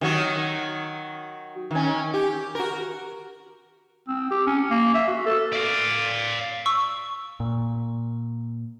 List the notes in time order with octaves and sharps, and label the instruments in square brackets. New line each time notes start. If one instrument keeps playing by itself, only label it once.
[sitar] D#3 F#3 F#4
D#3 C#4
G4
F#4 A#4
[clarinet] C4
G4
C#4
A#3
E5
F#4
A4
[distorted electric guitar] D5 F5
[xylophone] C#6 E6
[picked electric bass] A#2